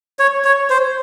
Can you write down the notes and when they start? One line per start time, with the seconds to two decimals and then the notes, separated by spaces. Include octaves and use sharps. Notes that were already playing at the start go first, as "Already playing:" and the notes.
0.19 C#5
0.45 C#5
0.70 C5